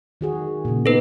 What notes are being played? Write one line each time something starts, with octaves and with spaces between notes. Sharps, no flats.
D#3 F#4 G#4
A#2 C#3
B3 D#4 A4 B4